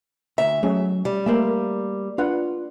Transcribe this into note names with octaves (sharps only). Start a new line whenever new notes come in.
D2 E5 A#5
F#3 A3 C#4 G#4
G3
A3 A#3 C5 D5 E5
D4 F4 B4 F#5